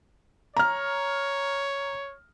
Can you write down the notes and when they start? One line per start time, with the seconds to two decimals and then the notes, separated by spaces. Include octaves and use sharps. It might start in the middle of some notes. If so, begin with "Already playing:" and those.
0.57 C#5 A#5 F6